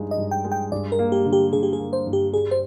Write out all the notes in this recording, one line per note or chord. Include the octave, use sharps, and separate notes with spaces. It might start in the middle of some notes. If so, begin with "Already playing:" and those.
Already playing: G2 F3 G#3 D#4
D#5
G2
G5
G#3
G5
G2 D5
A#4
A#3
G4
D3
G4
D3 G#4
G4
G#4
A#3
C5
G2
G4
G3 G#4
C5